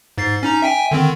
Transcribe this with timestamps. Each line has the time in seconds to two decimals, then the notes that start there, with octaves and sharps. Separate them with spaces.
0.18 G#2 A6 C7
0.43 C#4 D#4 A#5
0.62 E5 G5 G#5
0.91 D3 D#3 C4